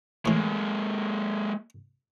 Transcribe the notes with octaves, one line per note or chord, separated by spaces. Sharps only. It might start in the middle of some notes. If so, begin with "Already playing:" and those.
A2 E3 G#3 A#3